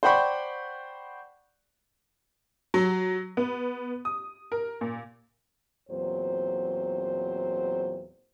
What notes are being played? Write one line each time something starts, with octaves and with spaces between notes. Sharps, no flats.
C5 D5 F#5 G5 B5 C#6
F#3
B3
D#6
A#4
A#2
E2 A#2 F#3 C4 C5